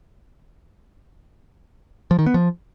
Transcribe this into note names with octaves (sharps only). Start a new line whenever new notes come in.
F3
D#3
B3
F3